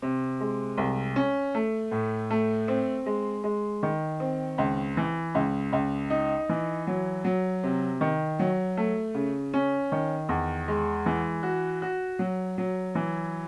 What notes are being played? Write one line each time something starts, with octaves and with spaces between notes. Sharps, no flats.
C3
G#3
C2
C#4
A3
A2
A3
C4
G#3
G#3
D#3
C4
C#2
E3
C#2
C#2
D#4
E3
F#3
F#3
C3
D#3
F#3
A3
C#3
C#4
D#3
E2
G#3
E3
F#4
F#4
F#3
F#3
E3